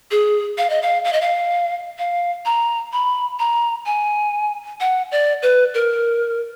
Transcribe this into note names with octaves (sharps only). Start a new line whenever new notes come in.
G#4
F5
D#5
F5
F5
D#5
F5
F5
A#5
B5
A#5
G#5
F#5
D5
B4
A#4